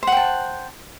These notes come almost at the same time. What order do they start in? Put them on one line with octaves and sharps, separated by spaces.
C5 F#5 G5 A5